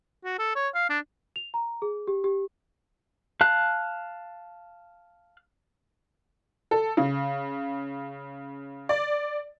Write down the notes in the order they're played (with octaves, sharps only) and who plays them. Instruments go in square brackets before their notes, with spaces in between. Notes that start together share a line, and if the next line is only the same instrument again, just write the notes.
[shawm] F#4
A4
C#5
F5
D4
[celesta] F7
A#5
G#4
G4
G4
[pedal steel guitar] F5 A5 F#6
[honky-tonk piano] A4
C#3
D5